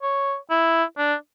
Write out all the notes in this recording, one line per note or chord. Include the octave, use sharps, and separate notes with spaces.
C#5
E4
D4